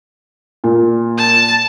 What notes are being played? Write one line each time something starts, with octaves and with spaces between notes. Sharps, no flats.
A#2
A5